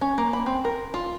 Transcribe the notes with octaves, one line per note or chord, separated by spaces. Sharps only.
C#4
A#3
B5
C4
A#4
F4